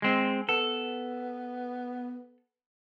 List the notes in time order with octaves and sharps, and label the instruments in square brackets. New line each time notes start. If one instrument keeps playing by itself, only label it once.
[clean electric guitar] G#3 C4
[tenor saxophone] B3 [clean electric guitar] A4